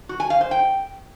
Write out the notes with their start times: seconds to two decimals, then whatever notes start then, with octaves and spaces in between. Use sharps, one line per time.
0.09 F#4
0.20 G#5
0.30 F5
0.41 C5
0.51 G5